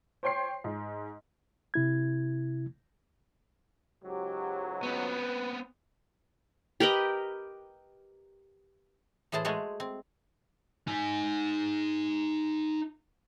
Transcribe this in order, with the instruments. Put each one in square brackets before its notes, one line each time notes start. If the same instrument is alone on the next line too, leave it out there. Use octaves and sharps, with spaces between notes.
[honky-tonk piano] C5 C#5 G5 C6 C7
G#2
[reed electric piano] C3 E4 G#6
[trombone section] C#2 G#2 F#3 [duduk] G4
[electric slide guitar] B3 C4 [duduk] B4
[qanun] G4 A#4 B4 D#5
[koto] A2 E3 G#4 C5 A5
G#3 A3 F#4 G#4 C5
C4
[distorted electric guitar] D#4 G#5